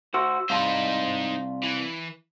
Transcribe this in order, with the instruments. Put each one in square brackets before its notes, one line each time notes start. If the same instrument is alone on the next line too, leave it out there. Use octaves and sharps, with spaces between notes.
[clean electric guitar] F#4 C5 [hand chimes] E6
[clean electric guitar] C2 [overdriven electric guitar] D#4 C5 [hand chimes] F5 A5 C6
[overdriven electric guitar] E3